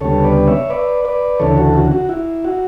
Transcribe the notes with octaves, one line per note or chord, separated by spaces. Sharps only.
D2 C#3 G3 B3 A4 C#5
B4 D5
C#5 E5
B4 D5
B4 D5
D2 C#3 E3 A4 C#5
F#4 A4
F#4
F#4
E4
F#4